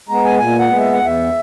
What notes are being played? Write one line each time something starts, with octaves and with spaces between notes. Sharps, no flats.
G#3 B3 A#5
G#5
A#2 G#5
F#5
G#3 B3
E5
F#5
E2
E5